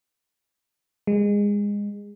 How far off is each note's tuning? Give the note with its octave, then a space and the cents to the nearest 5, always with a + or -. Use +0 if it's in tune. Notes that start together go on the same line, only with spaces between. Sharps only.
G#3 -25